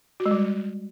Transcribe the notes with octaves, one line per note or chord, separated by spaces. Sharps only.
F#4
G#3
G3
G#3